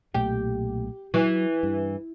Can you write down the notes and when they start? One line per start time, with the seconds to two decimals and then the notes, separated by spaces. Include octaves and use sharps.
0.14 B1 A#2 A3 G4
1.14 E3 F#3
1.63 G2